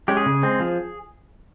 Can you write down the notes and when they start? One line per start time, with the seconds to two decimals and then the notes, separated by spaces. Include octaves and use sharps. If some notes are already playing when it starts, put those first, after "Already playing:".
0.08 G#3 C#4 G4
0.17 G#4
0.26 C#3
0.43 G#3 C4
0.60 F3